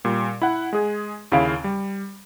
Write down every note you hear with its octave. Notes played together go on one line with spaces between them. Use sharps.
A#2 G3
E4 F#5
G#3 G#4
D#2 C#3 E4 F5 D7
G3